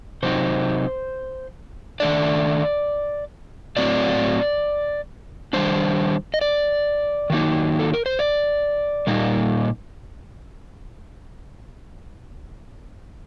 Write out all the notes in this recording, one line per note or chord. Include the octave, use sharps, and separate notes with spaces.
C3 F#3 C4 D#4 C5
D#3 A3 D4 D5
A2 F#3 C4 D5
D#3 G3 D4 C5
D#5
D5
D#3 F#3 A#3 D#4
A4
A#4
C5
D5
A#2 G3 A#3 D#4